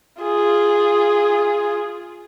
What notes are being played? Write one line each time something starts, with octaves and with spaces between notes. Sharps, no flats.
F4 G#4